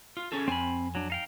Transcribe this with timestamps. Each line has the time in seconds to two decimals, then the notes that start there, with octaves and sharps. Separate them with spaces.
0.17 F4
0.32 C#4 G#4 A4
0.48 F2 C4 G#5 B5
0.95 F#3 D4
1.10 D#4 F5 G5